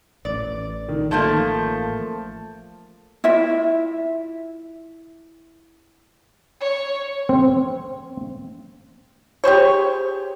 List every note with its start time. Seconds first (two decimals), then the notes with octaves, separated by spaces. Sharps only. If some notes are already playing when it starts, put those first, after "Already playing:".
0.25 A1 D5
0.89 D#3
1.11 F3 A3 A#3 A5 G6
3.24 E4 F4 E5
6.61 C#5
7.29 C4
9.44 G4 G#4 C5 C#5